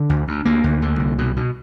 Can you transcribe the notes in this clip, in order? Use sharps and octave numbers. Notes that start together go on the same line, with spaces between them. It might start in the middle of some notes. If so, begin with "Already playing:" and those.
Already playing: D3
D2
D2
D2 A#3
D2
D3
C2
B2
B2